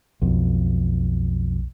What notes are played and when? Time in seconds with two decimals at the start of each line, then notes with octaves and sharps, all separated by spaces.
0.22 B1 F2